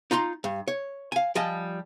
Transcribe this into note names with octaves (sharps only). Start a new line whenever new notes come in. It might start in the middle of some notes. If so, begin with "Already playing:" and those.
D#4 F4 A#5 C6
G2
C#5
F5 G#5
F3 G3 D#5 G#5 A5